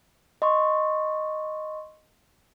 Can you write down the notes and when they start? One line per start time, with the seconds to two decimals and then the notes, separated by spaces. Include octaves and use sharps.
0.42 D#5 C6 C#6